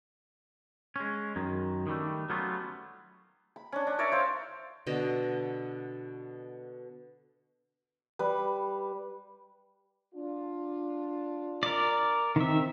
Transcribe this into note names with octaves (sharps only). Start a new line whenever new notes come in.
G#3 C#4
F#2 D#3
D#3 G3 A3
F#3 G3 A3 B3 C#4 F4
B5
C#4 D4
D4
A#4 C#5 D5 E5
C5 F5 E6
B2 D3 D#5
G3 B4
D4 F4
A#4 D5
D#3 C4 E5